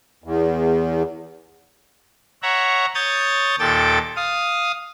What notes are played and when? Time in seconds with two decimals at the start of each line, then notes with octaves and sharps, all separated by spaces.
0.24 E2
2.43 C#5 E5 F#5 A#5
2.95 C#5 D#6 G6 A6
3.59 D#2 A#2 A4 G5 D6 A6
4.16 F5 D#6